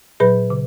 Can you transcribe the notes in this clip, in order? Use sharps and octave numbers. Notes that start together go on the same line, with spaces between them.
A#2 F#3 G#4 B4
C#3